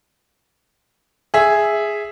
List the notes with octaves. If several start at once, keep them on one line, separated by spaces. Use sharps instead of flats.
G#4 E5